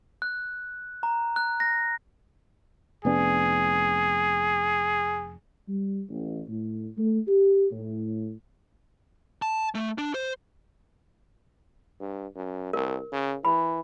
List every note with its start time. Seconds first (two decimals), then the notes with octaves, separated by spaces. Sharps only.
0.22 F#6
1.03 A#5
1.36 F#6
1.60 A#6
3.05 F1 B3 D4 G#4
5.68 G3
6.10 A1
6.49 A2
6.98 A3
7.28 G4
7.72 A2
9.42 A5
9.75 A3
9.98 D4
10.14 C5
12.00 G2
12.35 F#2
12.73 C2 A#4
13.12 C#3
13.45 E3 B5